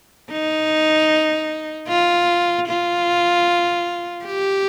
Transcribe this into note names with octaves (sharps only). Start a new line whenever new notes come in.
D#4
F4
F4
G4